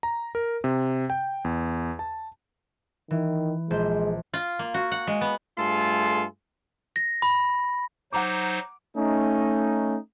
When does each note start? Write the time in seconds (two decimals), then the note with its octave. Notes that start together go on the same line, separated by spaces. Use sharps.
0.03 A#5
0.35 A#4
0.64 C3
1.10 G5
1.45 E2
1.99 A5
3.11 D#3 E3
3.70 A#1 G#3 C5 G6
4.33 F4
4.59 A#3
4.74 F#4
4.91 F#5
5.07 G#3
5.21 B3
5.58 G2 A3 F4 G#4 A4 C6
6.96 A#6
7.22 B5
8.13 F#3 D#4 C5 F#5 A#5 D6
8.96 A3 C#4 D#4